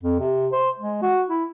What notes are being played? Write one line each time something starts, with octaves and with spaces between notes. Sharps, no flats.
F2
C3
C5
G#3
F#4
E4